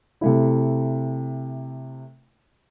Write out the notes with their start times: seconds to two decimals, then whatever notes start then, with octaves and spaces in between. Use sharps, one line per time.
0.21 C3 A3 E4